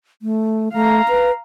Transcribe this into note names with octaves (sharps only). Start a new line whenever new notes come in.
A3
A3 F5 A#5
B4